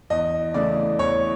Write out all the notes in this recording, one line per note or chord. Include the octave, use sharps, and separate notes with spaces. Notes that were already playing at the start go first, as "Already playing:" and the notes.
E2 D#5
C#3 E3 A3 D5
E2 C#5